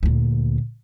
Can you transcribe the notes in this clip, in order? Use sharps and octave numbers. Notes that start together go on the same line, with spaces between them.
D2 A#2